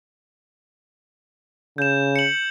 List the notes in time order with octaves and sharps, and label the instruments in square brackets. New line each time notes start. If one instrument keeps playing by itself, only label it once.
[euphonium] C#3 [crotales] G6 E7
[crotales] C#7 F#7